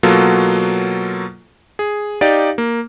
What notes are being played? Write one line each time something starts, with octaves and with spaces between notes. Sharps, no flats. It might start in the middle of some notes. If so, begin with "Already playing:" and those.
B2 F#3 A#3 F4 A4
G#4
D#4 G4 D5 F5
A#3